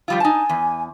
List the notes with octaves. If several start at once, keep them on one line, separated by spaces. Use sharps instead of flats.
F3 G3 F4
D#4 G#5 A5
E2